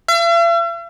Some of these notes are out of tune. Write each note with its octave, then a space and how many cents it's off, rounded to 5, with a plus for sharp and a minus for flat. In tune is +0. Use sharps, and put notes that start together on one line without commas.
E5 +45